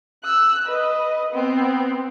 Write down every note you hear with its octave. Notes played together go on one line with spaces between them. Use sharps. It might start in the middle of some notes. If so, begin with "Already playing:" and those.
E6 F#6
B4 D#5
B3 C4